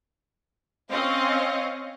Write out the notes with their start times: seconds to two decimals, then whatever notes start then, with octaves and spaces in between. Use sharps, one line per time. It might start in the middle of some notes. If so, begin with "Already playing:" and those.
0.91 C4 C#4 D#5 F5